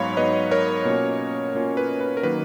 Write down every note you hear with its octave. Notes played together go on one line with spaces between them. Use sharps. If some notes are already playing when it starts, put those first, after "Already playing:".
Already playing: G#2 F#3 B3 D#4 C#5 F5 B5
G#2 F#3 B3 D#4 B4 D#5
A#4 C#5
B2 A#3 C#4 F4
B2 A#3 C#4 F4
B4
B4
A#4
D#3 F#3 A#3 B4